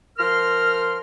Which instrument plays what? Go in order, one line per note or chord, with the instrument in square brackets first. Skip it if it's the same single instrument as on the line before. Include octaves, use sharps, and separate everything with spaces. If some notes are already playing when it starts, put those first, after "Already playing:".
[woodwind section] F3 A#4 C6 F6